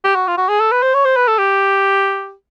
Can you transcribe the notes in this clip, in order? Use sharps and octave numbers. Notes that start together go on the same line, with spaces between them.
G4
F#4
F4
F#4
G#4
A4
B4
C5
C#5
C5
B4
A4
G4